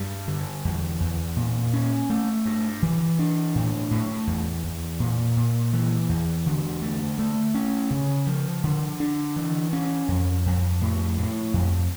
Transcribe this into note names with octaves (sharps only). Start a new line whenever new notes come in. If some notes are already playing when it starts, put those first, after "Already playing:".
Already playing: G2 G3
D3
E2
E2
A#2
C#4
A3
G2
E3
D4
A2
A2
E2
E2
A#2
A#2
E3
E2
D3
A3
A3
C#4
C#3
F3
D3
D4
E3
C#4
F2
F2
A2
A2
F2